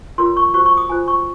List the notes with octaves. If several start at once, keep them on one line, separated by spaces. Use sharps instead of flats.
F4 A#4 C#5 C6
C#6
F#4 C5 C#6
C#6
D#6
F4 C5 G#5
C#6